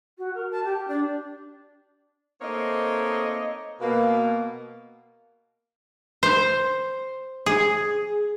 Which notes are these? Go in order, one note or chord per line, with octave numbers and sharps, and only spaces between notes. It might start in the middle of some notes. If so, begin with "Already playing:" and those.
F#4
A#4
A5
G4
D4
A3 A#3 C4 D#4 C#5 D#5
B2 A#3
C5
G#4